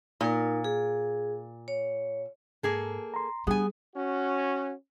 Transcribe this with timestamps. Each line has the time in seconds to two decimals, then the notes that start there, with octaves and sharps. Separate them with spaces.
0.21 A#2 D#4 A#4
0.64 G#4
1.68 C#5
2.63 G#2 A#3 G#4 A4
3.14 A#5 C6
3.47 G3 B3 D4 G#4 G#5
3.95 C#4 F#4